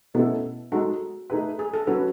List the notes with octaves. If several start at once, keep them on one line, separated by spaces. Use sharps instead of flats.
B2 A3 B3 C#4 E4 A4
G#3 D#4 F#4 A4
A3 D#4 G#4 B4
G#4
A4
F#3 C#4 F#4 A4 B4